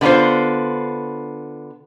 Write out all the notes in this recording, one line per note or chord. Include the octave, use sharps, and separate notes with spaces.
D3 B3 D4 F4 C5